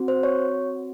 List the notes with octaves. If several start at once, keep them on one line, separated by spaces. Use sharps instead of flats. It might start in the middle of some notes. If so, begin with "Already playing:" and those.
Already playing: C4 F#4
C5
C#5